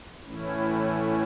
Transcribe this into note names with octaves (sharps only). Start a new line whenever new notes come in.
A2 E3 A3 C#4 E4